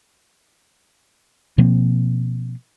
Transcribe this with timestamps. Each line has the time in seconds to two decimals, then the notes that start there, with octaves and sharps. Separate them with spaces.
1.58 B2 F3 A#3 C4